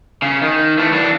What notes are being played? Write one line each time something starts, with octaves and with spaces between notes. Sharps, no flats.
C#3
D#3
E3 A3
E3 D4